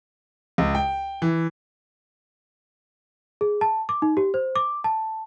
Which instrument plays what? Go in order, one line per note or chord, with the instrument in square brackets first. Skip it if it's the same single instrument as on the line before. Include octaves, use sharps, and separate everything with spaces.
[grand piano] C#2
G5
E3
[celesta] G#4
A5
D6
D#4
G4
C5
D6
A5